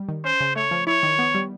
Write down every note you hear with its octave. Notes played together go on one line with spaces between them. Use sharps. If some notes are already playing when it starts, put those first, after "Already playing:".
Already playing: G3
D#3
C#4 C5
C#3
A3 C#5
F3
E4 C#5
D#3
B3
G3